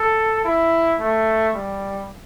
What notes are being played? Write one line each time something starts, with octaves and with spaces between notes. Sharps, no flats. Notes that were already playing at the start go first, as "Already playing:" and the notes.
Already playing: A4
E4
A3
G3